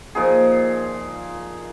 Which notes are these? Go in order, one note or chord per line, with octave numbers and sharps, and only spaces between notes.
A#2 F3 D#4 G#4